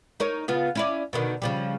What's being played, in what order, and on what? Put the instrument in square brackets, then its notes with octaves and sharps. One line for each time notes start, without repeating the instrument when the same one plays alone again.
[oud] D#4 A#4 C#5
C#3 B3 F4
C#4 E4 D5
B2 D3 D#3
C#3 F3 G3